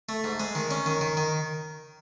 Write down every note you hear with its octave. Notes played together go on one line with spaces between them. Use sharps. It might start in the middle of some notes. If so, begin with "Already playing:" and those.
A3
G#2
G#3
D#3
C#4
D#3
D#3
D#3